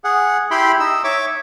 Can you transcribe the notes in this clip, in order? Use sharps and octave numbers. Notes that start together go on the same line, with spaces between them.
G#4 F#5
E4 G4 G5 B5 C6
D#4 E6
C#5 E5 D6